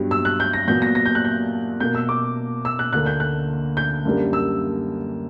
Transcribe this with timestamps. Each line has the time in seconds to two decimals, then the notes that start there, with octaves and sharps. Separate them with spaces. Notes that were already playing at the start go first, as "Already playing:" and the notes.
Already playing: G2 F#3 B3
0.11 E6
0.25 F#6
0.40 G6
0.53 A#6
0.68 A#2 F#3 B3 G6
0.82 A#6
0.95 A#6
1.06 G6
1.15 F#6
1.25 G6
1.80 B2 A#3 G6
1.95 E6
2.09 D6
2.65 E6
2.79 F#6
2.93 D2 D3 A#3 F#6
3.06 G6
3.20 F#6
3.77 G6
4.05 F#2 D3 G3 A#3
4.33 E6